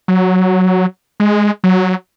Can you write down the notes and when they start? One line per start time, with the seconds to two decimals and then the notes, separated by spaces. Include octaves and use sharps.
0.08 F#3
1.20 G#3
1.64 F#3